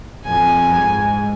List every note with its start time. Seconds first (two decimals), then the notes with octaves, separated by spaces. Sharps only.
0.25 F2 G#5
0.72 G#2